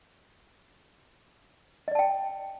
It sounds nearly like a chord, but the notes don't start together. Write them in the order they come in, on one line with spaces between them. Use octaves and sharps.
D#5 D5 A5 G5